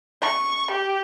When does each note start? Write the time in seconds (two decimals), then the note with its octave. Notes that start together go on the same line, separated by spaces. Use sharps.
0.22 C#6
0.71 G4